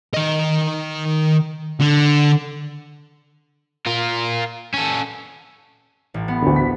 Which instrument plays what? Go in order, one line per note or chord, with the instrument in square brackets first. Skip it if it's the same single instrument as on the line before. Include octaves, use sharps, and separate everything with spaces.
[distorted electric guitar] D#3 D#5
D3
[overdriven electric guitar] F4 A#4
C#4 A4
[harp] A1
B3
[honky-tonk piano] D2 D3
B6